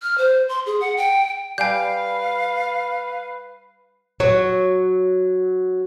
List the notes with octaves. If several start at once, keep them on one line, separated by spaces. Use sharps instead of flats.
F6
C5
C6
G#4
F#5
G5
G3 B4 F5 G#5 G6
F#3 C#5